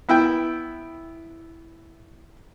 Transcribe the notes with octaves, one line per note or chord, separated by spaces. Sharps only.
B3 E4 E5 G5